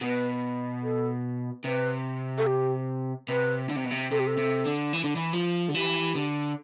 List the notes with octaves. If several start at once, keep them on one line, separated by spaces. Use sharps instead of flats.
B2 B4
A4
C3 B4
A4
G4
C3 B4
D3
C3
B2
C3
C3 A4
G4
A4
C3
D3
E3
D3
E3
F3
D3 A4
E3 G4
D3